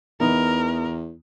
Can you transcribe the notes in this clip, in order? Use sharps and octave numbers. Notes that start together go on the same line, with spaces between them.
E2 E3 B3 D#4 A#4